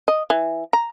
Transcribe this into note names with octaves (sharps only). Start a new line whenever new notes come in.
D#5
E3
A#5